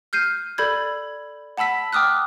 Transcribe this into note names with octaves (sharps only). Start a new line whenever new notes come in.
F6 G6 C7 D#7
A4 D5 B5 G6 G#6
F#5 A5 B5 E6 B6
G5 D6 D#6 F6 F#6